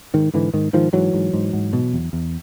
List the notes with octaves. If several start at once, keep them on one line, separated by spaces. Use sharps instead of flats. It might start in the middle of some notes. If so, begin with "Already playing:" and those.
G#2 D#3
G#2 D3 E3
G#2 D#3
G#2 D#3 F3
G#2 E3 F#3
G#2
G#2
G#2
B2
E2
E2